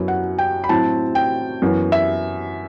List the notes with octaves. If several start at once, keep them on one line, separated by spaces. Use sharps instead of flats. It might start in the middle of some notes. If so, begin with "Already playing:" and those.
Already playing: F#2 F#3 B3 E4
F#5
G5
B5
A2 F#3 C4 E4 A5
G5
F#2 E3 B3
E5